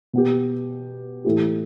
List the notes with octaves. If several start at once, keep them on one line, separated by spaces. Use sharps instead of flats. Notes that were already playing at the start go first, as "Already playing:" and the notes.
B2 B3 G4
A2 E3 A3 G4